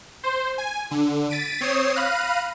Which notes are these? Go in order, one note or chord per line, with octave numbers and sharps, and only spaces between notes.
C5
G#5
D3
A6 B6 D7 D#7
C4 C#5 D#6 C7 E7
F5 B5 F6 F#6 A#6 D#7